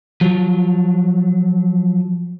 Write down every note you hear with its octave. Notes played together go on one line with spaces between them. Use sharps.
F3 F#3